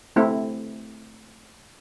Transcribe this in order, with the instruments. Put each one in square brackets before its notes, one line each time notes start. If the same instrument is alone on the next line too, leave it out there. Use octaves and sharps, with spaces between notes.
[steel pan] A3 C4 E4